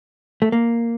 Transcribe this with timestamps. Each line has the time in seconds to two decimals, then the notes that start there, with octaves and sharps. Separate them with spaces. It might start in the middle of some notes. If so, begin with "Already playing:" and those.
0.42 A3
0.52 A#3